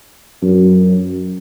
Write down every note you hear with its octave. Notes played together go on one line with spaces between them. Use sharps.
F#2